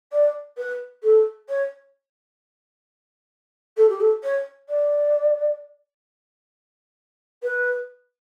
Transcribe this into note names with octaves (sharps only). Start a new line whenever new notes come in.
D5
B4
A4
C#5
A4
G4
A4
C#5
D5
B4